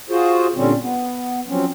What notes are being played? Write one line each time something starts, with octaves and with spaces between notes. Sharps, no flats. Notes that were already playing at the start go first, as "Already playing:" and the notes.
F4 F#4 G#4 C5
A#2 D3 G3 C4 C#4
B3
F3 F#3 C4 C#4